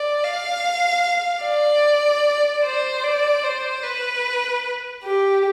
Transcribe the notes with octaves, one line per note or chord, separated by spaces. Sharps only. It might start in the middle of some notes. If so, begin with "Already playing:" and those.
Already playing: D5
F5
D5
C5
D5
C5
B4
G4